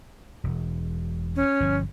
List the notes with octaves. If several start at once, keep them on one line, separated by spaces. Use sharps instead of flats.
E1
C#4
G1 F3